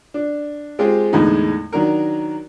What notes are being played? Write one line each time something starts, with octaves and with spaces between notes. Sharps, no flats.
D4
G#3 C4 F4 G4 G#4
E2 A2 D3 G#3 D#4
D#3 F#3 D4 A#4